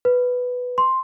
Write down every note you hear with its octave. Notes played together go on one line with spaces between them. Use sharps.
B4
C6